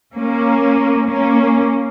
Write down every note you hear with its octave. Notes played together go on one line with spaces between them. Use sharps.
A#3 C#4
A#3 C#4